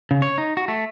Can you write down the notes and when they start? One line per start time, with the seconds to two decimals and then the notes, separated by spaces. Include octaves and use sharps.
0.11 C#3
0.22 C#5
0.38 D#4
0.57 F#4
0.68 A3